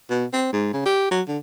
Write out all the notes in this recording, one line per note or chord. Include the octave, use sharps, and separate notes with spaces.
B2
C4
G#2
C#3
G4
F#3
D3